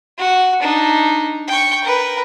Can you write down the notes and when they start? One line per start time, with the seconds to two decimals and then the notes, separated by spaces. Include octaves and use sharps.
0.18 F#4
0.60 D4 D#4
1.48 G5 C#6
1.84 A#4 B4